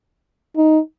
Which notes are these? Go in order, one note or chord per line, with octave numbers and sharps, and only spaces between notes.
D#4